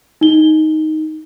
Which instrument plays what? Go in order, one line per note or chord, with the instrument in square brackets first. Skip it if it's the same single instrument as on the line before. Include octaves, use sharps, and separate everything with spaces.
[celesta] D#4 G7